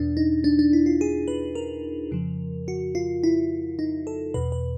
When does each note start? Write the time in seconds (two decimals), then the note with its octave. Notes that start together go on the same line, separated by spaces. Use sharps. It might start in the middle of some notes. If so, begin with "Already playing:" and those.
Already playing: E2 B2 D4
0.17 D#4
0.44 D4
0.59 D4
0.73 E4
0.86 F4
1.01 G#4
1.28 B4
1.55 A#4
2.11 F2 C#3 F3
2.68 F#4
2.95 F4
3.23 E4
3.79 D#4
4.07 A4
4.34 E2 B2 B4
4.52 B4